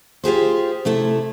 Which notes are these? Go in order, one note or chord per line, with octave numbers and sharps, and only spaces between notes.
F4 G4 G#4 C5
C3 A3 E4